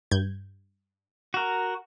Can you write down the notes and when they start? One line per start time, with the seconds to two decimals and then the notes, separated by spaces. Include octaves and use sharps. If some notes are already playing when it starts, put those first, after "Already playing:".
0.11 G2 G6 G#6
1.34 F#4 A#4